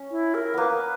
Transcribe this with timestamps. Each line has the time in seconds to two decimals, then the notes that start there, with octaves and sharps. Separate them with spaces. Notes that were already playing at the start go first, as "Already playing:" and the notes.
Already playing: C#4
0.11 E4
0.35 A#4
0.54 A#3 B3 B4